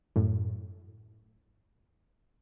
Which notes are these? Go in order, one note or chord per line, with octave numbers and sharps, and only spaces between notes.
F#2 A2